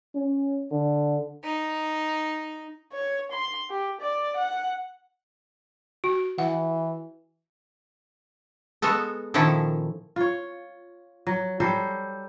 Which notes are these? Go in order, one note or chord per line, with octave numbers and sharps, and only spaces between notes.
C#4
D3
D#4
C#5
C6
G4
D5
F#5
F#4
E3 F#5
G#3 B3 F#4 A4
A#2 D#3 F3 C#4 E4 A4
F4 C#5
F#3
F#3 G3 A4 C5